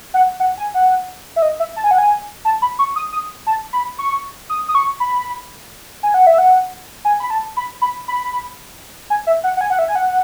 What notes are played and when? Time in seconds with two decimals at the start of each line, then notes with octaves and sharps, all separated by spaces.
0.14 F#5
0.40 F#5
0.58 G#5
0.74 F#5
1.36 E5
1.42 D#5
1.60 E5
1.76 A5
1.84 G#5
1.91 F#5
1.98 G#5
2.45 A5
2.62 B5
2.79 C#6
2.96 D#6
3.12 D#6
3.47 A5
3.73 B5
3.99 C#6
4.50 D#6
4.68 D#6
4.75 C#6
5.00 B5
6.03 G#5
6.14 F#5
6.27 E5
6.38 F#5
7.05 G#5
7.20 B5
7.30 A5
7.57 B5
7.82 B5
8.08 B5
9.10 G#5
9.27 E5
9.44 F#5
9.57 F#5
9.61 G#5
9.70 F#5
9.79 E5
9.88 G#5
9.95 F#5